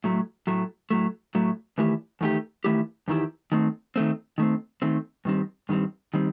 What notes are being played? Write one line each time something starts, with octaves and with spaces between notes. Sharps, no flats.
A2 F#3 A3
A2 F#3 A3
A2 F#3 A3
A2 F#3 A3
E2 D#3 A3 E4 G4
E2 D#3 A3 E4 G4
E2 D#3 A3 E4 G4
E2 D#3 A3 E4 G4
D#3 A3 C4
D#3 A3 C4
D#3 A3 C4
D#3 A3 C4
G2 D#3 G3 C4
G2 D#3 G3 C4
D#3 G3 C4